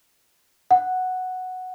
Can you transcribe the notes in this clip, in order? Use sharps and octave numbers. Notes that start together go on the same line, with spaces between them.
F#5